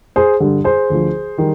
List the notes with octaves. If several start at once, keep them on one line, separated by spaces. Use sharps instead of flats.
G#4 C5
G2 D3 G3
G#4 C5
D2 D3 F3
D#3 G3